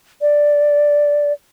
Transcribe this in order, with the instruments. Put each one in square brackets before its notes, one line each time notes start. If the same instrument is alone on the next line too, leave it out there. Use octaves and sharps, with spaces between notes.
[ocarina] D5